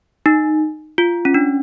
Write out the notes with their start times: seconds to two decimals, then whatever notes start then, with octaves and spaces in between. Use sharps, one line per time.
0.26 D#4
0.98 F4
1.25 C#4
1.34 D4